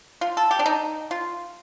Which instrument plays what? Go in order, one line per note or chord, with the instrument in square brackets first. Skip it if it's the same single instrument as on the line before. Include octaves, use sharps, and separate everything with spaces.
[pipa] F4
A4
G4
D4
D#4
F4